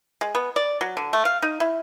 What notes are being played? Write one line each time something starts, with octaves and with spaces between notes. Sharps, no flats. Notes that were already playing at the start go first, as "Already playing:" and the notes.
G#3
B3
D5
F#3
D3
A3
F5
D#4
E4